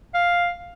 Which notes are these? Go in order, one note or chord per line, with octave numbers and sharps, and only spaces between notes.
F5